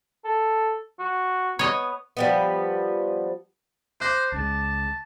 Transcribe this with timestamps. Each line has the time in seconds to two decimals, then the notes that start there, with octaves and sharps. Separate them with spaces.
0.25 A4
0.99 F#4
1.59 B3 C#5 D#5
2.17 F3 G3 B3
4.00 C5 D6 F#6 A#6
4.32 C#2 C#3 G#3 A5